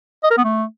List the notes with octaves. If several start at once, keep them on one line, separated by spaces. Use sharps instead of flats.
D#5
A#4
B3
A3